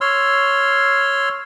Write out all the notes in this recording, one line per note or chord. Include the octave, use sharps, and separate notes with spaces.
C#5 C6 E6 F6